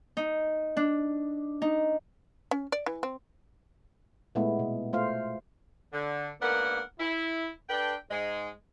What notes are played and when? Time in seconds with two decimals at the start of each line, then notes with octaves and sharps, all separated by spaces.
0.17 D#4
0.77 D4
1.62 D#4
2.51 C#4
2.72 D5
2.86 E3
3.03 C4
4.35 A#2 G#3 A3 B3 E4
4.59 B2
4.93 A3 F4 C5 F5
5.93 D3
6.41 G#2 A#3 B3 D4 A#4 F#5
6.99 E4
7.69 D4 A4 B4 G5
8.10 G#2 G#3